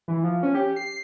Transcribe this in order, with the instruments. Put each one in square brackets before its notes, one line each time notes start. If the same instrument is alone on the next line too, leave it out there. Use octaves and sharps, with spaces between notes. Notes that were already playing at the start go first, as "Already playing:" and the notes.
[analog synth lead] E3
F3
C#4
G4
C7